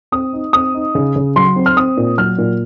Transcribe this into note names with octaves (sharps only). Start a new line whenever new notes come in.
C4 D#6
D#4
C4 D#6
D#4
C#3
C#3
F#3 C6
C4
F6
C4 D#6
A#2
F#3 F6
A#2